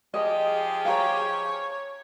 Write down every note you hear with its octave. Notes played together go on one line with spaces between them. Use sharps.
F3 G4 G#4 D#5
C#5 F5 A#5